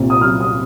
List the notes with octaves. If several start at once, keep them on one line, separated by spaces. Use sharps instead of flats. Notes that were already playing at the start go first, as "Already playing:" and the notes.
Already playing: C2 A#2
D#6
F#3 F6
D#6